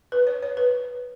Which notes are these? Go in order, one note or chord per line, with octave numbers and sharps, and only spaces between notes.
B4
C#5
C#5
B4